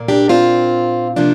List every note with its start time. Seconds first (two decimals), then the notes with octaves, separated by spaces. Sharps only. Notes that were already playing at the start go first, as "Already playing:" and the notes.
Already playing: A#2 A#3
0.08 D4 G4
0.29 C4 F4
1.16 C3 F3 A#3 D4